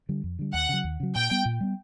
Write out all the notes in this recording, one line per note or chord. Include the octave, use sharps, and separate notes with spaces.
D3 G3
F2
D3 G3
D#2 F#5
C#3 F#3
D#2
C#3 F#3
A#2 G5
G3 B3
A#2
G3 B3